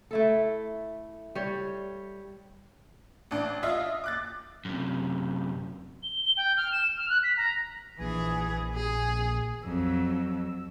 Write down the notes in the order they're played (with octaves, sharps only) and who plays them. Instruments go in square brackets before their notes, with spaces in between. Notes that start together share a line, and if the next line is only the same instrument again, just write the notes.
[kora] A3 E4 A4
G3 C#5
[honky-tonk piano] A1 D4
F4 D#5 E5
D6 F#6 A6
[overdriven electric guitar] F#2 C3
[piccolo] G7
G7
G5
F6
E7
F6
F#6
B6
A#5
[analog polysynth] A#1 [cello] E3 G#4
[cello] G#4
[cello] F2 F#3 [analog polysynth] E6